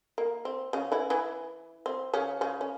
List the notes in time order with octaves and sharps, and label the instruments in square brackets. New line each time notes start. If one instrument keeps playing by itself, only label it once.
[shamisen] A#3
C4
C#3 C#4
E3 E4
E3 E4
C4
C#3 C#4
C#3 C#4
C#4